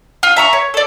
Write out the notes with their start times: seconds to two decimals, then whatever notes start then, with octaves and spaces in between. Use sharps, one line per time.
0.23 F4
0.36 E5 A#5 C#6
0.53 C#5
0.74 A4 D5